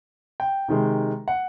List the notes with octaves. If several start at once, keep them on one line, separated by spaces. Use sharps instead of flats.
G5
C3 D#3 G#3
F#5